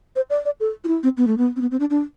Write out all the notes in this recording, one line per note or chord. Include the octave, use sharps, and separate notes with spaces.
C5
D5
D5
A4
F4
E4
C4
B3
A3
B3
C4
B3
C4
D4
D4